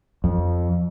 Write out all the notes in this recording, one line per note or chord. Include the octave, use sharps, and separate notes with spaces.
F2